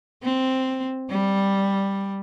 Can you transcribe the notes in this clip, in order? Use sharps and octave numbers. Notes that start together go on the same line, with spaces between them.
C4
G3